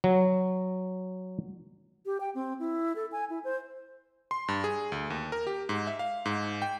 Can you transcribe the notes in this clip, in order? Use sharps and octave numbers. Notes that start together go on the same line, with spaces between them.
F#3
G4
G5
C4
E4
A4
G#5
E4
C5
C6
G2
G#4
D2
D#2
A#4
G4
G#2
E5
F5
G#2
G5